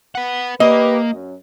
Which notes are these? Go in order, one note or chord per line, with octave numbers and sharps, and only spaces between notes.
B4 F#5
A#3 G4 B4 D#5
F#2